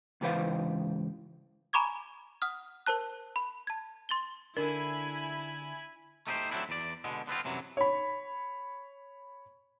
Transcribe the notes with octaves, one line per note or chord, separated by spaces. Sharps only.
C#2 G#2 E3 B4 C5 F5
G#5 A#5 B5 C#6 D6 G#6
F#5 D#6 F6
A#4 C5 A5 F#6
B5
A5 G#6
C6 A6 F#7 G7
D3 D4 E4 A#4 G#5 B5
A3 D#4 G4 G#4 C5
F#3 A3 C4 D4 E4
E2 D5
B2 D3 G#3
D3 B3 C4 F4
F#2 C3 E3 F#3
C#5 B5